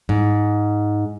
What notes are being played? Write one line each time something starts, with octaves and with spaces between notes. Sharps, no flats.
G#2